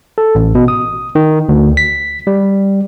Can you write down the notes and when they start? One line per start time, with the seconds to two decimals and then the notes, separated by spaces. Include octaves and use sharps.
0.18 A4
0.35 A1
0.55 B2
0.68 D#6
1.15 D#3
1.49 D2
1.77 B6
2.27 G3